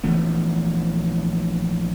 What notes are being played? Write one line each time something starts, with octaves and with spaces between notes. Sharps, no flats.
A#1 E3 A3 B3